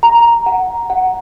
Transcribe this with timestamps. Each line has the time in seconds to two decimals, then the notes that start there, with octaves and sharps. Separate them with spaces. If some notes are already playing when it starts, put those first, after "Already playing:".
0.03 A#5
0.46 F#5
0.90 F#5